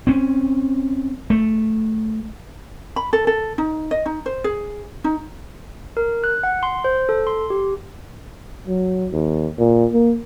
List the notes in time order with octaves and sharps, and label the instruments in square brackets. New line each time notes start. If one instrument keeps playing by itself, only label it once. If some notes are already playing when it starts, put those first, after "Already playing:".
[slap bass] C4 C#4
A3
[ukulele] B5
A4
A4
D#4
D#5
D#4
C5
G#4
D#4
[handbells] A#4
F#6
F#5
C6
C5
A4
C6
G4
[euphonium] F#3
D#2
A#2
A#3